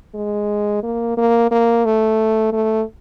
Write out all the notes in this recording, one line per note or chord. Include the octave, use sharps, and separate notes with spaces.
G#3
A#3
A#3
A#3
A3
A3